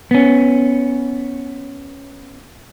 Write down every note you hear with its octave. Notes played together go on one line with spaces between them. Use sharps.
B3 C#4